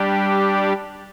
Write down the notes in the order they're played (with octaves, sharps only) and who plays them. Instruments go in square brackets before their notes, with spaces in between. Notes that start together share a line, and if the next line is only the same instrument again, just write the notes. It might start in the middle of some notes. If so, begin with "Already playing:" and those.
Already playing: [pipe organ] G3 D4 G4